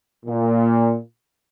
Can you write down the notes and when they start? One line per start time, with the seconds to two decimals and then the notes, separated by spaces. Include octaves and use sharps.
0.26 A#2